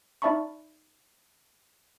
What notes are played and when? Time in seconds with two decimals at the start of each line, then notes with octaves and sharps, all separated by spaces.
0.22 D#4 D5 E5 A5 B5 C#6